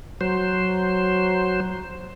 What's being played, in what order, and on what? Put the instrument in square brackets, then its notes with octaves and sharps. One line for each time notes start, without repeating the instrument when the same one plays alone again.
[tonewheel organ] F#3 C5